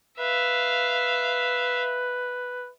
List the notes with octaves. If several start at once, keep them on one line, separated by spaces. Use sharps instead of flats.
B4 E5 F5